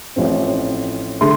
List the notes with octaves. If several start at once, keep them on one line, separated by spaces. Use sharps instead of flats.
A1 A2 F3 C4
D3 A3 C6